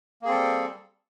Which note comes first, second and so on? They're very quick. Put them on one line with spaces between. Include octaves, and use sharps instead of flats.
A#3 G#4 C4 A4 G3